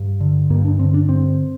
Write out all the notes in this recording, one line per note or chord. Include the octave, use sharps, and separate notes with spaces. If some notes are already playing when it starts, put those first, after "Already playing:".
Already playing: G2
D3
G2 A#3
D4
D3 C4
D4
G2 C4